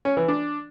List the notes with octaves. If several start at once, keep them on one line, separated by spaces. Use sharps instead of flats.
C#4
E3
D4